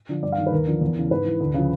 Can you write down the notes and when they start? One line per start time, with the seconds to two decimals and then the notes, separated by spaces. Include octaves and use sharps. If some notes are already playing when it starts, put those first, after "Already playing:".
0.09 D3 F3
0.23 G2 D5
0.32 F5
0.38 D#3
0.46 B4
0.52 D#2 A#4
0.67 D3 F3
0.81 E2
0.96 C#3 E3
1.10 G#2 B4
1.25 E3
1.40 D2
1.54 C#3 F3